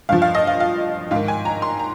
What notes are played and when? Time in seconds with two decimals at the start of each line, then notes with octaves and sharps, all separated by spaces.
0.09 G2 F3 F5
0.22 F5
0.35 D#5
0.47 F5
0.60 F5
1.11 G#2 F5
1.15 D#3
1.28 G#5
1.45 A#5
1.62 C6
1.79 A#5